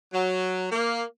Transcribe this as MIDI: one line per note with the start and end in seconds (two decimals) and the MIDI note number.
0.13 0.67 54
0.72 1.03 58